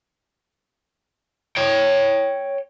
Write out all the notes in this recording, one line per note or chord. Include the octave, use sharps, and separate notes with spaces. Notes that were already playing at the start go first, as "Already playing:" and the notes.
C#5 G5